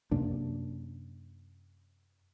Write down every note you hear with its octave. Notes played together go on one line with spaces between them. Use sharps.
F#2 C3 A#3 D4